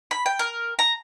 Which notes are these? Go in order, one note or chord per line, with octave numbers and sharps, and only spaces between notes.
B5
G5
A#4
A#5